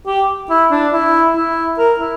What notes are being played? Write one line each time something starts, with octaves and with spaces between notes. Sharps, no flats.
G4
E4
D4
E4
E4
A#4
E4